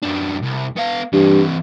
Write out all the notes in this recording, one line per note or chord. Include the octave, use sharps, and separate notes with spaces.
F#2 D4
C2
B3 F5
G2 E3 C4